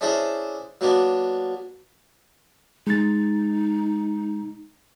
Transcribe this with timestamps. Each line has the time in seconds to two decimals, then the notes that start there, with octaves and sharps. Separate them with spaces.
0.01 C#4 D4 E4 G#4 C5
0.81 F#3 A#3 B3 D4
2.87 G#3 D#4 A6